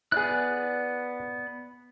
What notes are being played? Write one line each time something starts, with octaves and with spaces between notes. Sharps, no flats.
B3 E4 G#4 D5 F#6